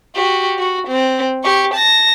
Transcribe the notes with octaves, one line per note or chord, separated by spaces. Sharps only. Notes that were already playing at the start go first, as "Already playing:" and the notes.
F#4 G4
F#4
C4
G4 C#6
A5 A#6